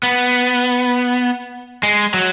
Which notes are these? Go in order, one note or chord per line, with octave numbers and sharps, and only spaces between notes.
B3
G#3
F#3